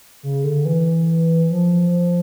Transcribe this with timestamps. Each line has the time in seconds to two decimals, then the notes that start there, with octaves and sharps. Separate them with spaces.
0.23 C#3
0.44 D3
0.65 E3
1.50 F3